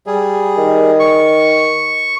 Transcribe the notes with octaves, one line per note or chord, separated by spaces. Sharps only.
G3 G#4
D#3
C#6